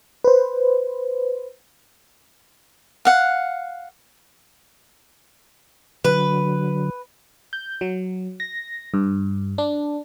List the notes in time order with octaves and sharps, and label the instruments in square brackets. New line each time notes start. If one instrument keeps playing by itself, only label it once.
[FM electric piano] B4 C5
[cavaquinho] F5 F#5
[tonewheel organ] D3 F#3 [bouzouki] B4
[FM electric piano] G6
F#3
A#6
G2
D4